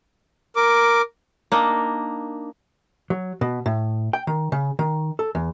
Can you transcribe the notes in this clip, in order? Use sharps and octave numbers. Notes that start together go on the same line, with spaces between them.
A#4 D6
A#3 D4 D#4 D#5
F#3
B2
A2
G5
D#3
C#3
D#3
A4
E2